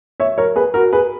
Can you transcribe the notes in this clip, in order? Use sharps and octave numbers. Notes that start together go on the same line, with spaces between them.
C#5 E5
A#4 C#5
G#4 B4
F#4 A#4
G#4 B4